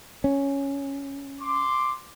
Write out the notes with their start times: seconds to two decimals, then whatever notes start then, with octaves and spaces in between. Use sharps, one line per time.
0.24 C#4
1.41 C6 D6